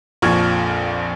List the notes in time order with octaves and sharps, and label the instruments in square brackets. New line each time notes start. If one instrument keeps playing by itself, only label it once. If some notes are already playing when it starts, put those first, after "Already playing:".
[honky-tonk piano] A#1 F2 F3 C#6 F6 G#6